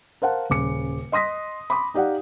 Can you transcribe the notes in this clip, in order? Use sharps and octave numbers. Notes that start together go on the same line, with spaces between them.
A#4 C5 F5 F#5 A5
D#1 C#3 D6 C#7
D#5 C6 D#6 A#6 B6
B5 C6 D6 D#6
D#4 G4 D5 F5 F#5